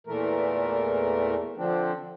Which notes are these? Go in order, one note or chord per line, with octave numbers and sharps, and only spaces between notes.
E2 A#2 E3 A3 A#4
D3 F3 C4 D4